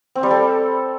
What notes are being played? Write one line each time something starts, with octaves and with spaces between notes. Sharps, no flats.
C4
G3
A4